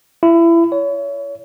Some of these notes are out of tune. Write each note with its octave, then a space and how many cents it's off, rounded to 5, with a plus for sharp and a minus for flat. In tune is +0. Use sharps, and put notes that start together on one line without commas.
E4 +25
C#5 +30